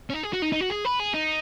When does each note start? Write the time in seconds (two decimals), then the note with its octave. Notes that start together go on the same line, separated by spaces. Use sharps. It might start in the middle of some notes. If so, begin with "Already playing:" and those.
0.10 C#4
0.14 D#4
0.23 G#4
0.33 F#4
0.42 D#4
0.52 D#4
0.61 F#4
0.70 G#4
0.85 B4
1.00 G#4
1.14 D#4